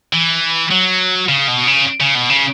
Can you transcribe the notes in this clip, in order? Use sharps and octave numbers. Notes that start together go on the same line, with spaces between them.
E3
F#3
C#3
B2
C#3
C#3
B2
C#3